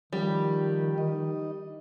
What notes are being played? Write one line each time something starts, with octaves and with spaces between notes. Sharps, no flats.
D#3 F3 G3 G4
D#4 D#5